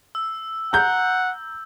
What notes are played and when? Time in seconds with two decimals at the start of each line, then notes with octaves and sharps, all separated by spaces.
0.15 E6
0.73 F#5 A#5 G6